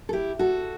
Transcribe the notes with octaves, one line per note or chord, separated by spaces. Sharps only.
A4
E4 G4
F#4 A4